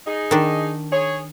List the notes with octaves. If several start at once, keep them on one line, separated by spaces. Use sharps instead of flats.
D#4 G#4
D#3 D4
G#4 C#5